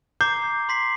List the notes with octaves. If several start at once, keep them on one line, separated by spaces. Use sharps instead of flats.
A#5 D6 G6 C7
C6 B6 C7